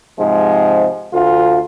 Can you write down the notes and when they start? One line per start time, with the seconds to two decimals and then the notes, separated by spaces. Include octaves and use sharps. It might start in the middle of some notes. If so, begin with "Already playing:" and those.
0.18 G#2 C3 F3 G#3
1.13 D2 F4